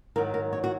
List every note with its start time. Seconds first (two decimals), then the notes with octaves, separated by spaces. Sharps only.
0.16 G#2 D#3 F#3 A#4
0.34 A#4
0.53 C#5
0.64 F#4